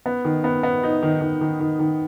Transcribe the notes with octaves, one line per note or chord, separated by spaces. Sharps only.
B3
D#3
B3
B3
D#4
D#3
D#3
D#3
D#3
D#3